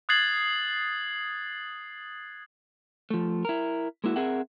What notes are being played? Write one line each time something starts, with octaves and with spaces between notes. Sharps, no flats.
D#6 F#6 G#6 A6 C7 F#7
F3 A3
E4 A#4
G#3 A#3 E4 F#4
C4 G#4 A#4 E5 F#5